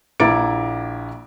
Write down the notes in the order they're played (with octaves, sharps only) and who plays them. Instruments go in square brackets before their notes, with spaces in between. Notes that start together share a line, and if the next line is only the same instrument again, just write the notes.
[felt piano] A#1 E4 A#5 D6 A6 D7